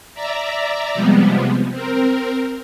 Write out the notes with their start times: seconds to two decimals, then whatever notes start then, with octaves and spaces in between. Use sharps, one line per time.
0.14 D5 E5 A#5
0.94 C3 F3 G3 G#3 B3
1.70 C4 A#4